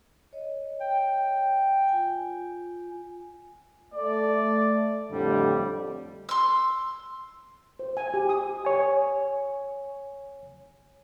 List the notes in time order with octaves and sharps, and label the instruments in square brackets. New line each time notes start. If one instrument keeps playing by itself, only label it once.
[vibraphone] C#5 D#5
[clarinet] G5
[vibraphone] F4 G#5
[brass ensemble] A3 D5
F2 A2 D3 G3
[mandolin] C6 E6
[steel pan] C5
G#5
G4
D#6
[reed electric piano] C#5 G#5